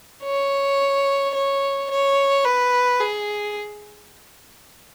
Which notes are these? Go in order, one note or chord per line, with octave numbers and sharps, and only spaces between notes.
C#5
C#5
C#5
B4
G#4